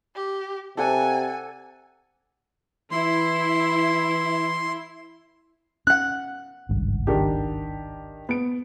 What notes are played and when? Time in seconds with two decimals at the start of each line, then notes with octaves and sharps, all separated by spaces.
0.15 G4
0.77 C3 A4 D5 F#5 G#5
2.91 E3 E4 C6
5.87 C#4 F#5 F#6
6.69 G#1 C#2 G2
7.07 D#3 D4 G4
8.29 B3 D7